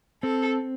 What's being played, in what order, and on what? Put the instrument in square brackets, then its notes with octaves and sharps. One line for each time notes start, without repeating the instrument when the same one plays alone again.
[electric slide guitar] C4 [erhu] A4